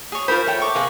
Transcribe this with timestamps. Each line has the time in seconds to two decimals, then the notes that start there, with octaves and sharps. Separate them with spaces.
0.12 G#4 C#5
0.28 F4 A#4 C5 B5
0.47 A3 C#5 G5
0.62 C#6 D6
0.75 C3 A#3 G#4